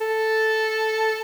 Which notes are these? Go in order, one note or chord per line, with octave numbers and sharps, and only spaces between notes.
A4